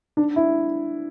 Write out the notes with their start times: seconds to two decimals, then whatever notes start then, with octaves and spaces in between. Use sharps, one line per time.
0.17 D4
0.36 E4